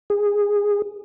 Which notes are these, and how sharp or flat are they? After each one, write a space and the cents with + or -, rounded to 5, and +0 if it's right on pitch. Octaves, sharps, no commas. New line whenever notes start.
G#4 -15